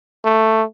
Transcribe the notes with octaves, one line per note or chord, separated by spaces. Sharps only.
A3